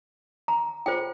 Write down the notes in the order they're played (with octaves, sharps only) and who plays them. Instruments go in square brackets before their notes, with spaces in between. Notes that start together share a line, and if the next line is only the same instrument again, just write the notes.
[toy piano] A#5
F4 G#4 C5 G5